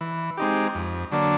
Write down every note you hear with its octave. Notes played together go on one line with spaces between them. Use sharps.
E3
G#3 C4 D#4 G4
F2
D3 F#3 A#3 D4